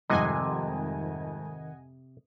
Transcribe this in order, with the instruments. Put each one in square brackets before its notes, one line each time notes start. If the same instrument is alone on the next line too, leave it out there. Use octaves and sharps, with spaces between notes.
[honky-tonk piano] F2 G#2 G3 [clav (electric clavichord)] C3 [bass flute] D#3 [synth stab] D#5 F#5 G#5